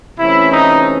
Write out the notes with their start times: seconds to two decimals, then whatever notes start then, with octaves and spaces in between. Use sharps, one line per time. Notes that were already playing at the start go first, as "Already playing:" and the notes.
0.19 C3 E3 A3 C#4 E4
0.52 D#4